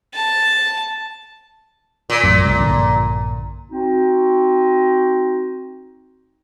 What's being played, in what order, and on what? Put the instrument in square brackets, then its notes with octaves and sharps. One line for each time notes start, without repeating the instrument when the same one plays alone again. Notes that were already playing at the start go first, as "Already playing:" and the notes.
[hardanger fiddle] A5
[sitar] A#2
[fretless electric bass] A1 F#2
C2 C3 G3
A#1 G2 D3
[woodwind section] C4 D#4 F#4